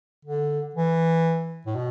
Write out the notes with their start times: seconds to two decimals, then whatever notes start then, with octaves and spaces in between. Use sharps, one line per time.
0.25 D3
0.75 E3
1.67 A2
1.76 B2